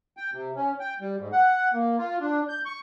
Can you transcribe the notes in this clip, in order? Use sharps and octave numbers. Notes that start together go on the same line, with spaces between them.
G5
C3
C#4
G5
G3
G#2
F#5
A#3
F4
D4
G6
C#6